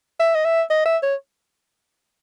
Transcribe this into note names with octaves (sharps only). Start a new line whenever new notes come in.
E5
D#5
E5
D#5
E5
C#5